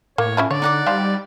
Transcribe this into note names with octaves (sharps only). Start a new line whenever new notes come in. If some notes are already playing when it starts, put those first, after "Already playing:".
A2 A#3 C#5
C#4 E4 F4
D3 C#5 D5
D#4 F#5 D6
F3 G3 F4 G4